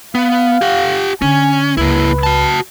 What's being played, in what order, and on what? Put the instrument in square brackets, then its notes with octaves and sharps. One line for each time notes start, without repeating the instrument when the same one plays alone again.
[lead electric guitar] B3 [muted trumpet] F5
[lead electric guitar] G4 F#5
[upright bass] D3 [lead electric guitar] C#4 [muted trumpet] G#5
[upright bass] C#2 [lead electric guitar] A#3 E4 [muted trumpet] B4
[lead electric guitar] F#4 A5